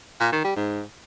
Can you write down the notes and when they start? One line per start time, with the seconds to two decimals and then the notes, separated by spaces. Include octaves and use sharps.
0.20 A#2
0.32 D#3
0.44 G3
0.56 G#2